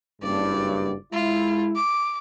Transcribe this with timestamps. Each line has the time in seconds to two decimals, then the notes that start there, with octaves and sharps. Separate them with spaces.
0.22 F#1 G2 D5
1.13 G#3 E4 F4
1.76 D6